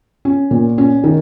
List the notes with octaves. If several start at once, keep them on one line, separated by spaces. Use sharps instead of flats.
C#4
A#2
C#4
D#3